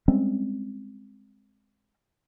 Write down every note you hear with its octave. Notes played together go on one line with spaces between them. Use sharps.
G3 G#3 C4 C#4